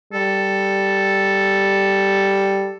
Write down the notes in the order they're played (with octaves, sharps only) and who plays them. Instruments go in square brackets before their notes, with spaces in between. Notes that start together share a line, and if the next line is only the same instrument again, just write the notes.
[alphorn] G3 [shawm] A4